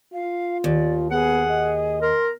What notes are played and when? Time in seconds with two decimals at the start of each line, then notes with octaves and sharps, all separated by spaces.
0.13 F4 F5
0.64 D#2 D5
1.11 B3 G#4 F#5
1.50 D#5
2.02 A#4 C6